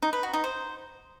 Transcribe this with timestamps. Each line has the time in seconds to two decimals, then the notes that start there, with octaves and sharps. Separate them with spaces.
0.02 D#4
0.13 B4
0.23 F#4
0.33 D#4
0.44 C5